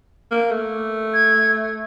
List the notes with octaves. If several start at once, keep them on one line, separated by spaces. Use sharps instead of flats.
A#3
A3
G#6